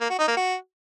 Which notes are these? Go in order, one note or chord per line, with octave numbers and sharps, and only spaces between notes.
A#3
F#4
D#4
A#3
F#4